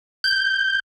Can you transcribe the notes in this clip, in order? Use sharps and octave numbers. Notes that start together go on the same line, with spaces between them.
G6